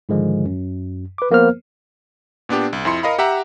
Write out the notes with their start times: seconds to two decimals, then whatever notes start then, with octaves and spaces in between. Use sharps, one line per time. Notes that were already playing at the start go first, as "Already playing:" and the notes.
0.09 G#2 D3 D#3 F3 G#3
0.46 F#2
1.18 B4 D6
1.31 F3 A#3 B3 A#4 C5 F6
2.49 A#2 B3 D4 G4
2.73 C2
2.85 F2 E4 C6 C#7
3.03 A#4 D#5 F5 B5
3.18 G4 E5 F#5 A#5